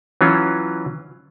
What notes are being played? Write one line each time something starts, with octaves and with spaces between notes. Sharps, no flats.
E3 F#3 C#4 F4